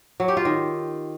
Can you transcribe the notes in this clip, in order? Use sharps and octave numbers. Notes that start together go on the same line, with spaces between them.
F#3
G4
F4
D#3